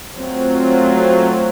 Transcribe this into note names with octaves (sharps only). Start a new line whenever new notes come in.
F#3 A3 C4 F4